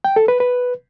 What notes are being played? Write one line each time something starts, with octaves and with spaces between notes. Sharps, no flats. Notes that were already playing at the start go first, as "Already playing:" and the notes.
G5
A4
B4
B4